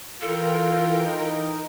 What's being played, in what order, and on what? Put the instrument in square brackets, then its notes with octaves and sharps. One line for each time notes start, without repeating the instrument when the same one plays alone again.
[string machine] E3 A#4 G5 [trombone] F4 [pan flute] A4
[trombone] D#4